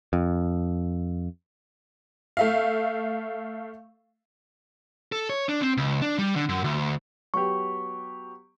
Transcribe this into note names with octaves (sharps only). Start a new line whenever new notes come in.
F2
A3 E5 F5
A4
C#5
D4
C4
C#2
D4
G3
D3
F#2
D2
F#3 B3 G4 C#6